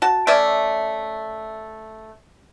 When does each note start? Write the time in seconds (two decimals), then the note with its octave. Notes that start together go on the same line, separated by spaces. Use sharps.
0.02 F#4 A5
0.27 A3 C#4 D5 E5